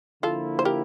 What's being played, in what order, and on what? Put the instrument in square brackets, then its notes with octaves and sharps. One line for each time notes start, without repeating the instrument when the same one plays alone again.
[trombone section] D3 F3 A#3 E4 [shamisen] F4 A4
[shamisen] C5
G4 A#4